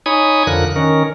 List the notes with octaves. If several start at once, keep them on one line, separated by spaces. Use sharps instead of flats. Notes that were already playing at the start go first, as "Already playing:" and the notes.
D#4 C#5 G#5 B5 D#6
F2 D3 F3 A#4 F#6
D#3 C#4 A#4